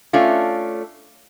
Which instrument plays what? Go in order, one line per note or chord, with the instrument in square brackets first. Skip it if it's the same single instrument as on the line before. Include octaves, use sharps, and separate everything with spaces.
[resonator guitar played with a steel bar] A3 C#4 D4 F4